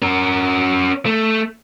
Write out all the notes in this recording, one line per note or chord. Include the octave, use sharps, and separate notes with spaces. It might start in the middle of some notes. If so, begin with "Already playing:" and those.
C#4 A#4
A3